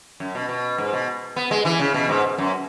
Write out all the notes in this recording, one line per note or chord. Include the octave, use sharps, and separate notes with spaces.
F#2
B2
B2
G#2
B2
B3
G#3
E3
C#3
B2
G#2
F#2